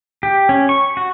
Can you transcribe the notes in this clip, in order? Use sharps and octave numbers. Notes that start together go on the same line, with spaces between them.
G4
C#4
C#6
F#4